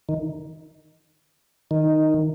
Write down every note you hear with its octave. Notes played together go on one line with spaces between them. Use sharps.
D#3
D#3